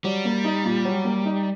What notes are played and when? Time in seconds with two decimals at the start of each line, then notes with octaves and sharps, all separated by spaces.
0.04 F#3 G3
0.25 A#3
0.44 D#4
0.65 A#2
0.85 F#3
1.04 A#3
1.25 D#4